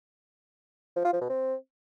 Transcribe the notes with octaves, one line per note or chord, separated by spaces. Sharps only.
F3
F4
F3
B2
C4